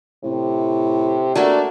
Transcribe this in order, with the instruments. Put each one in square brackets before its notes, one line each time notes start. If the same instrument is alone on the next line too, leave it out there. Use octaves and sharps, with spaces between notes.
[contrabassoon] A2 [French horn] C3
[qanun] A3 A#3 F#4 [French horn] D4